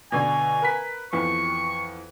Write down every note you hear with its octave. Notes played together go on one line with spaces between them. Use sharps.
B2 D3 G#5
A#4 B4 B6
F2 E3 B3 C#6